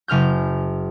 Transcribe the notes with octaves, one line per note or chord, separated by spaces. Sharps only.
F#1 C#3 F6 G6